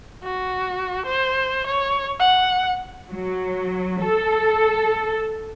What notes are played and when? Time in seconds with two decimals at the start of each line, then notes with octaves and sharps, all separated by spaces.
0.24 F#4
1.06 C5
1.67 C#5
2.20 F#5
3.10 F#3
4.00 A4